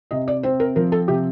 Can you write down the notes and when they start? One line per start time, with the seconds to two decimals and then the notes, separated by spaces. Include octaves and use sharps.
0.11 C3 D#5
0.28 D5
0.43 C4 C5
0.60 A#4
0.76 F3 A#4
0.92 A4
1.08 C3 G4